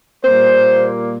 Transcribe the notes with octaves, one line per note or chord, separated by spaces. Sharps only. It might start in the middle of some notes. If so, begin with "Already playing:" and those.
A#2 G3 A#3 C5